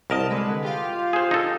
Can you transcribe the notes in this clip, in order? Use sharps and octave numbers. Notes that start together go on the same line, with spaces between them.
C2 A#4 D#5 A5
D3 G#3 B4
F4 G4 F5
G#4 C5
D#4 A4